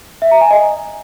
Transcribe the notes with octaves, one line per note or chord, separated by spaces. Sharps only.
E5
A#5
G#5
D#5